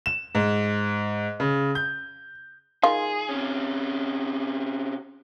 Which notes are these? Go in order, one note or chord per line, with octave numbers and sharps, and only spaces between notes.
E7
G#2
C#3
G6
D#3 F4 G#4
C3 C#4